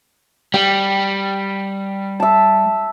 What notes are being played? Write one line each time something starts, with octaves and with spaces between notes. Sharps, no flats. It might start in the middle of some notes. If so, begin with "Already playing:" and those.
G3 G5
E5 A5